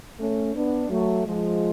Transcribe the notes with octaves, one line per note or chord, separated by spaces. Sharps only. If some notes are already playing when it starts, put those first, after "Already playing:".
A3 C#4
B3 D4
F#3 A3
F3 G#3